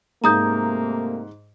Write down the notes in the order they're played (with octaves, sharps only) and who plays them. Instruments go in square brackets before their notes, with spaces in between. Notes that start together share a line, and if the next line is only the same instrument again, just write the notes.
[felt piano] G#2 [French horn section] C3 A3 A#3 [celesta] A#5 D#6 G6